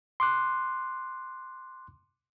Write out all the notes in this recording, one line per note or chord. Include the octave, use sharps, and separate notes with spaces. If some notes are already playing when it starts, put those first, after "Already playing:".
C6 D6 F#6